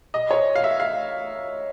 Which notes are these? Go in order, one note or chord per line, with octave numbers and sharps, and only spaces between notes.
D#5
C#5
F5
E5
F5